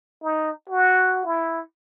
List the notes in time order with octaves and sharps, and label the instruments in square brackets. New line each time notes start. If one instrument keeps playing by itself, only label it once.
[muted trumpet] D#4
F#4
E4